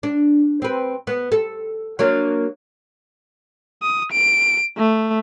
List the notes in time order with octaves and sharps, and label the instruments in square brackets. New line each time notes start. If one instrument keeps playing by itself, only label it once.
[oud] D4
C4 B4
B3
A4
F#3 A#3 D4
[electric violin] D#6
D7
A3